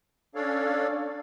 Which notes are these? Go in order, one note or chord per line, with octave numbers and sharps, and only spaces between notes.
C#4 D4 A4 C#5 D5 F5